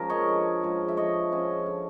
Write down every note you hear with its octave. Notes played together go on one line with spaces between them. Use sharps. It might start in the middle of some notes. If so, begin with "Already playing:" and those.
Already playing: F3 G#3 C#4 A#4
C#5 D#5
D3
F3 G#3 C#4
E5
D3 C#5 D#5
F3 G#3 C#4
D3